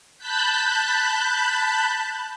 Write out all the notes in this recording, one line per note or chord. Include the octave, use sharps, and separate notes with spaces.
A5 B5 F#6 G6 B6